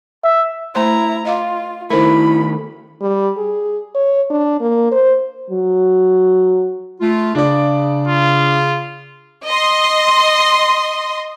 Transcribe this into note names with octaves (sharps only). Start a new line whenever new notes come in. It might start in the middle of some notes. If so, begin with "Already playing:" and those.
E5
A3 E4 C5 A#5 C6
F4 D#5 F5 D6
D#3 A3 E4 A#4 C5 B5
G3
G#4
C#5
D4
A#3
C5
F#3
A3 F4
C#3 D4 D5
F4
D#5 C6